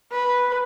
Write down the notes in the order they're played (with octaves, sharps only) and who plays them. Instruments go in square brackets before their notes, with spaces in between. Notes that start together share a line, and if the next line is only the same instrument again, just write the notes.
[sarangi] B4